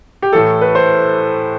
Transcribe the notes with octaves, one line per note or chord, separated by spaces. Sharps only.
G4
A2 E3 A3 A4
B4
C5